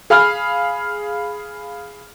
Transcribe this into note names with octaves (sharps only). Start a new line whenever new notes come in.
G#4 F5 B5 F6